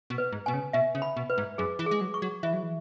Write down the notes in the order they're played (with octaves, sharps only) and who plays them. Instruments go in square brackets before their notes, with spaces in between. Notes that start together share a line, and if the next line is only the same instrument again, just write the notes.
[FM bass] B2
[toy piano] B4
[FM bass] G#2
[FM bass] B2 [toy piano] G#5
[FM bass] C#3
[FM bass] B2 [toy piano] E5
[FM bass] C#3
[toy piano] B5
[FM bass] B2
[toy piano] B4
[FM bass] G#2
[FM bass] F#2 [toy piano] G#4
[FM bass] E3
[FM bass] G#3 [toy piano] G#4
[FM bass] F#3
[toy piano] C#6
[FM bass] F#3
[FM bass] E3 [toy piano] E5
[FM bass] F#3
E3